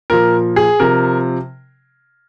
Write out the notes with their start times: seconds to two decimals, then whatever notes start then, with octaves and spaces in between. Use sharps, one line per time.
0.10 A#2 F3 A#4
0.56 G#4
0.80 C3 F3 A#4